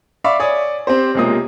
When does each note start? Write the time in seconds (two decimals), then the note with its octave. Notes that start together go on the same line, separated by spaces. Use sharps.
0.24 D5 E5 F5 B5 C#6 D6
0.40 C#5 D5 G#5 D#6
0.87 C4 G4 C5
1.15 B1 C3 G#3 A#3 F4 D#6